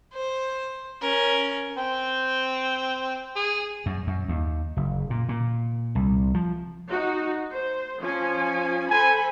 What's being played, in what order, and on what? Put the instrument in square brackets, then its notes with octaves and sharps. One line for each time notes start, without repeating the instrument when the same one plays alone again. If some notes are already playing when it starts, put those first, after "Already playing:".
[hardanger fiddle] C5
C#4 A#4
[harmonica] C4 G5
G#4
[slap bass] F#2
F#2
D#2
F#1
A#2
A#2
C2
F3
[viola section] D#4 F#4
C5
F3 C#4 G#5
[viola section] A4 C5 B5 [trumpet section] G#5